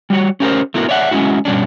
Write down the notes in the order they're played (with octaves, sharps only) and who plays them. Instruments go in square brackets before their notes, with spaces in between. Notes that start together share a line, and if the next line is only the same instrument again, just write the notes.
[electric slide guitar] G3 F#4 C#5
C#4 G4 A#4 C5
A3 B3 E4 F#4 A4 A#4
C#5 D5 E5 F#5
G#3 C#4 E4 F#4
G2 B2 G3 C#4 D4